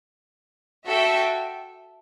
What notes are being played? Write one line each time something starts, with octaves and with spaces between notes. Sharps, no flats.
F#4 A4 E5 G5